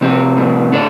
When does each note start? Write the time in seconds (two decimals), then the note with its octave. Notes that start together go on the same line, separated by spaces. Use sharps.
0.01 A2 C3 C4
0.37 A2
0.72 A2 D3 D4